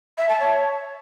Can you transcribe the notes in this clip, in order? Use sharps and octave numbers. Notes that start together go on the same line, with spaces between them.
E5
A5
C#5